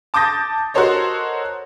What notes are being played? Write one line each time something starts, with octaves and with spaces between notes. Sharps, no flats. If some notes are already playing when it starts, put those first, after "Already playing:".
A5 D6 D#6 G6 A6 A#6
F#4 A4 A#4 C5 C#5 D#5